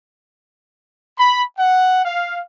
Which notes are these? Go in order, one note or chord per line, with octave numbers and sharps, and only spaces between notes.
B5
F#5
F5